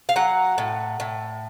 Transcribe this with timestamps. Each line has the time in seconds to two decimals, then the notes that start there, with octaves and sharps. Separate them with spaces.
0.09 F5
0.16 F#3 F#5
0.58 A2
1.00 A2